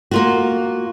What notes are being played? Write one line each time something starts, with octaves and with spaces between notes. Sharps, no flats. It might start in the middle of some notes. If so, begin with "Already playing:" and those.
A#3 F4 F#4